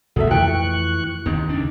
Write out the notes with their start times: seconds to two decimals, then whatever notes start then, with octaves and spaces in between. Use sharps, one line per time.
0.16 C2 A#2 A3 F#4 G#4 A4 E5
0.31 F2 E3 A3 G5 C#6 F#6
1.26 D#2 D#3 C4 D#4
1.49 D2 C#3 D4